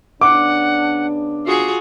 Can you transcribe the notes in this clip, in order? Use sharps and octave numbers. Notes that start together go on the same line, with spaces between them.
C#3 B3 D4 F#5 D6
F4 F#4 G#4 C7